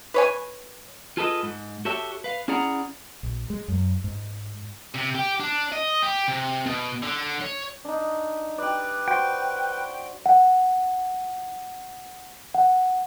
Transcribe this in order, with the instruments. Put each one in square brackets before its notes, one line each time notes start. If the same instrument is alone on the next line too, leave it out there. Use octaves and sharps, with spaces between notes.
[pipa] B4 C#5 G#5
[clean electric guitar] F4 G#4 A4 B4 D5 D#5
G#2
F#4 G4 A4 C#5 E5
B4 F5
C#4 E4 G#4 D5 F#5 A#5
[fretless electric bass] A#1
G#3
F#2
G#2
[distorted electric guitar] C3
G4
D4
D#5
G4
C3
B2
D3
C#5
[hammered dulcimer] D4 D#4
[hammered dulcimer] G4 D5 [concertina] B4
[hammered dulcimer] F#4 C5 [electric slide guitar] G5
[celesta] F#5
F#5